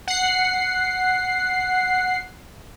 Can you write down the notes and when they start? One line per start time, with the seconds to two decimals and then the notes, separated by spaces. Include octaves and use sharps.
0.08 F#5 C7